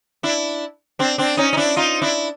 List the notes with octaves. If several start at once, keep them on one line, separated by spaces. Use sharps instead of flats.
D4 E4
C4 D4
C4 D4
C#4 D#4
D#4
D4 E4
D#4 F4
D4 E4